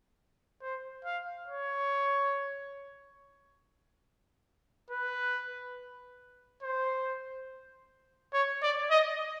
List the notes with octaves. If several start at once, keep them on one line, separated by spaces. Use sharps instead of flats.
C5
F5
C#5
B4
C5
C#5
D5
D#5